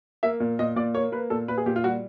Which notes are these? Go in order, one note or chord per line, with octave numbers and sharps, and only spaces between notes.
A#3 E5
A#2
A#2 D#5
A#2 D5
A#3 C#5
A#3 B4
A#2 A4
A#2 B4
G#4
A#2 G4
F4
G3 F#4